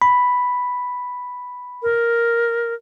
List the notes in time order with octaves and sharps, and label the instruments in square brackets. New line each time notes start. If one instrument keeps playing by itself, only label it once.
[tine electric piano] B5
[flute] A#4